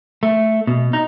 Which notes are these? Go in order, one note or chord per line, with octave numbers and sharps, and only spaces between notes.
A3
B2
D#4